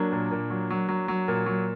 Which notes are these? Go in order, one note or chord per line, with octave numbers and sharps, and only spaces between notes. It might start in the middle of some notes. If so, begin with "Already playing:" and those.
Already playing: F#3 A#3 D4
A#2
A#2
F#3
F#3
F#3
F#3
A#2
F#3